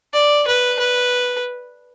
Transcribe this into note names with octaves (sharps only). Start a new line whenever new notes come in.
D5
B4
B4